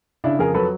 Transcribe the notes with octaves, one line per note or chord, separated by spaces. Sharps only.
C#3 D4 E4
F2 G#4 A#4
F#3 A4 B4